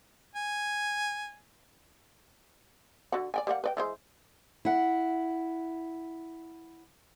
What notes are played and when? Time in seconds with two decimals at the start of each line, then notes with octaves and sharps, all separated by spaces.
0.35 G#5
3.12 D3 F#4 F#5
3.34 D5 G5 G#5
3.47 G3 A#3 F#5
3.64 B4 D5 G5
3.77 E3 G#3 C5
4.65 E4 F#5